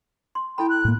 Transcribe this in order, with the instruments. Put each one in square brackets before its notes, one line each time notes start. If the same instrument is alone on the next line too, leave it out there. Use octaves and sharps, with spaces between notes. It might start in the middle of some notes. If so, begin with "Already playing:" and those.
[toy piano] C6
[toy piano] E4 A4 B5 [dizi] G5
[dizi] F#6
[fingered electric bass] A2 A#3